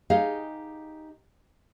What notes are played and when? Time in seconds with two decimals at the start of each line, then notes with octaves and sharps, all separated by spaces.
0.10 D#4 G4 G#4 D#5 F5